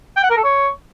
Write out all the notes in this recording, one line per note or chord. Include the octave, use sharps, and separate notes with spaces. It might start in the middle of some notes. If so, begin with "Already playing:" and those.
G5
F#5
A#4
A4
C#5